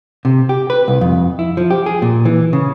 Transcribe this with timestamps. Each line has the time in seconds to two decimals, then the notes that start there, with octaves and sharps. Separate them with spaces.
0.25 C3
0.49 G4
0.70 B4
0.88 C2
1.01 F2
1.39 E4
1.57 F3
1.70 G4
1.86 G#4
2.02 A#2
2.25 E3
2.53 C#3